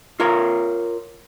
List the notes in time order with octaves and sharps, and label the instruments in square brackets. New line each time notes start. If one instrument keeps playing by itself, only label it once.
[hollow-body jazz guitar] F4 A#4 C#5 A#5